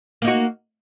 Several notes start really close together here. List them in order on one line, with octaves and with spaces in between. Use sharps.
A#3 D#4 F#4